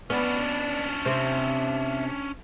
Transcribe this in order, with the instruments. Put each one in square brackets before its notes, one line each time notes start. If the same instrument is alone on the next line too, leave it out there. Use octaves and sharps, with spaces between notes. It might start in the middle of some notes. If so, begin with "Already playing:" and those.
[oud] B3 [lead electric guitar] C#4 D4 [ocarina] D5
[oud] C3 C4 [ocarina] E5